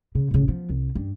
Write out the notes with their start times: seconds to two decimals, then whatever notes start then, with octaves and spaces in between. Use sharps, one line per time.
0.15 C#3
0.31 A1 C#3
0.48 F3 B3
0.70 C2
0.95 G2